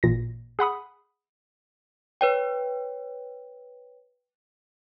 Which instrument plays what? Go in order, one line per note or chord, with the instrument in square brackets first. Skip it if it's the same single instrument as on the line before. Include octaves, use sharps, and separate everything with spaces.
[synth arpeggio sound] A1 A#2 A#6
G#4 F#5 B5 D#6
[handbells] B4 C#5 G5